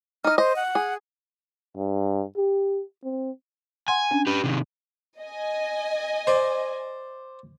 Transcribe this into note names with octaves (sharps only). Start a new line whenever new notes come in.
D#4 D#5 F6
C5 D#5
F#5
G#4
G2
G4
C4
F#5 G#5 C6
C#4 D4
G4 B4
C3 D#3
D#5 G#5
C5 D5